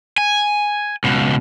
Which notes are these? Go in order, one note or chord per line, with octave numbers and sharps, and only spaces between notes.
G#5
C#2 B2